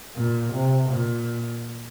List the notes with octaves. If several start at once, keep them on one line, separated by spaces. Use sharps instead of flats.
A#2
C3
A#2